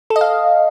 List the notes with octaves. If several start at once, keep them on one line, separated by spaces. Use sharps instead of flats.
A4
D#5
F5